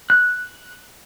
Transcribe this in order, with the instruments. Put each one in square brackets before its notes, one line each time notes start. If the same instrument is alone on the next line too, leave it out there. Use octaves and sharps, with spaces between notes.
[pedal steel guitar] F#6